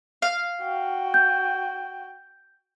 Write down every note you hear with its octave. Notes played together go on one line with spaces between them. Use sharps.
F5
F#4 G5
G6